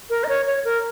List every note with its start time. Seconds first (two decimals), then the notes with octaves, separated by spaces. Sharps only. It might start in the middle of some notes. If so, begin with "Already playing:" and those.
0.10 A#4
0.24 D#5
0.29 C#5
0.47 C#5
0.65 A#4